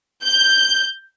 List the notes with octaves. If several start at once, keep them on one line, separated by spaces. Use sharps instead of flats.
G6